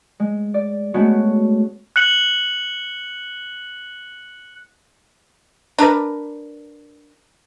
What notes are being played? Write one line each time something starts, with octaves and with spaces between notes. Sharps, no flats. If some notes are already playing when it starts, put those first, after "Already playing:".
G#3
D5
G#3 A3 B3 C#4 F#4
F#6 C#7 F#7
D4 A#4 B4